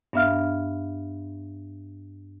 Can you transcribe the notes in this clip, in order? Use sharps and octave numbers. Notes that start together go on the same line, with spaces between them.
G2 B3 D4 E5 F5 F6